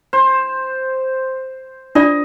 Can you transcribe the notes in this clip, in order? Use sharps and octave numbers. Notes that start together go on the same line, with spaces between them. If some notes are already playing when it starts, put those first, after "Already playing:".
C5
D4 F4 D5 D#5